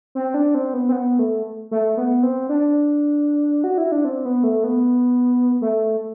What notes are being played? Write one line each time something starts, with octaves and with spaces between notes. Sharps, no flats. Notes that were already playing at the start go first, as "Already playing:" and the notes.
C4
D4
C4
B3
C4
B3
A3
A3
B3
C4
D4
F#4
E4
D4
C4
B3
A3
B3
A3